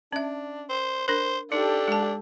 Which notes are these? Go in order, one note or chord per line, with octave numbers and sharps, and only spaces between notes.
C#4 D4 E5
C5
D4 A#4 C5
D4 D#4 G4 A4
G#3 A5